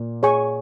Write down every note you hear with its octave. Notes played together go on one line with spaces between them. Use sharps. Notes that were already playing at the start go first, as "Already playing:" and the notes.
Already playing: A#2 A#3
G#4 C#5 G#5 C#6